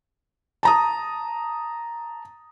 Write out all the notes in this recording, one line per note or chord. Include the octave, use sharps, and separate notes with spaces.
A5 A#5 D#6